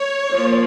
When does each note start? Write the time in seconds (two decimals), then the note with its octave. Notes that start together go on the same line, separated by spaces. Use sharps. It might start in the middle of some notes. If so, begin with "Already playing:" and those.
Already playing: C#5
0.33 F3 A#3